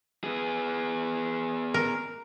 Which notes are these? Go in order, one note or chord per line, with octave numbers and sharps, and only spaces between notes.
B3 G#4
A#4